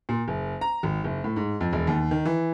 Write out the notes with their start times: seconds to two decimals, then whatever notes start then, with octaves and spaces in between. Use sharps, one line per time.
0.09 A#2
0.28 F#1
0.61 A#5
0.83 G#1
1.04 F#1
1.24 A2
1.36 G#2
1.60 F2
1.73 E1
1.87 D#2
2.11 D#3
2.25 E3